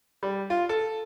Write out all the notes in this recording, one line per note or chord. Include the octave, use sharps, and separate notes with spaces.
G3
F4
A4